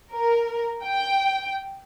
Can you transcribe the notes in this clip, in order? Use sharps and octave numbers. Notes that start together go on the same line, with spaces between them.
A#4
G5